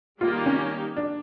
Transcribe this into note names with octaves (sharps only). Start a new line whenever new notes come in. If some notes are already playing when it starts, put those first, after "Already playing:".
D#3 G3 A#3 D#4 F4 G4
C#4
D4